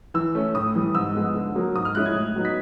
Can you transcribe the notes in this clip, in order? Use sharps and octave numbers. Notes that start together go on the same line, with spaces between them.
E3 E6
A3 C#4
A2 D#6
E3 G3
G#2 E6
F3 G#3 B3
D3
F#3 A#3
G#2 D#6
F6
F3 G#3 C#4 E4 F#6
G#6
A2
F#3 B3 D#4
B6